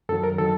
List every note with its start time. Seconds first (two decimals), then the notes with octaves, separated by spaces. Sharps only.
0.09 F#2 D#3 F#3 A4
0.23 A#4
0.38 D#3 F#3 A4